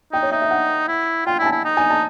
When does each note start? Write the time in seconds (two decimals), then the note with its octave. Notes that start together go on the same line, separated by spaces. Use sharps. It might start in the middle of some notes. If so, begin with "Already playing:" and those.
0.12 D#4 G5
0.23 C#5
0.32 D#4 E5
0.42 E5
0.51 F#5
0.88 E4
1.26 F4 G5
1.39 E4 G#5
1.46 A5
1.52 E4
1.65 D#4
1.77 G#5
1.90 A5